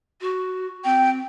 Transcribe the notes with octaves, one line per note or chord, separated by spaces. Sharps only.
F#4
C4 G5